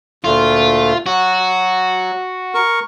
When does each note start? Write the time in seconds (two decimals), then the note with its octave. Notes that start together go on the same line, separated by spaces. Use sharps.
0.24 D2 A#2 A3 F4
1.06 F#3 F#4
2.54 A#4 C#6